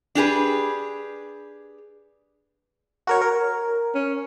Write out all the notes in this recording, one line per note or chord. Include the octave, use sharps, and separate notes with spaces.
D4 G4 G#4 B4
F#4 A#4 C#5
A#4
C#4